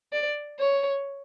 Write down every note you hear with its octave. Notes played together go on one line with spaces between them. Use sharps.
D5
C#5